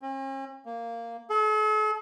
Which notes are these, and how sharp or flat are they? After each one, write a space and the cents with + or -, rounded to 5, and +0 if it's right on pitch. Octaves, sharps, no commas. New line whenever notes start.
C#4 -45
A#3 -10
A4 -45